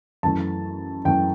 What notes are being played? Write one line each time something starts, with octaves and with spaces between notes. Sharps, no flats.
F#2 E3 A3 A5
F#2 E3 A3 G5